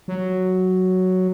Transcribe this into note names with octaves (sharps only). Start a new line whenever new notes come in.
F#3